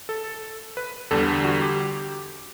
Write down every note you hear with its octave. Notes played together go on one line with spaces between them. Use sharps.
A4
B4
E2 D3 G3 A4
F#4
G4